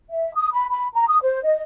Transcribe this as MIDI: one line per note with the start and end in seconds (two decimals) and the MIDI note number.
0.09 0.34 76
0.34 0.49 87
0.52 0.64 83
0.70 0.87 83
0.93 1.06 82
1.07 1.20 87
1.22 1.40 72
1.43 1.61 75